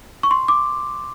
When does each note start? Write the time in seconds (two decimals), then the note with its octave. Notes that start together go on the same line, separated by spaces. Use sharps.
0.23 C#6
0.31 C6
0.48 D6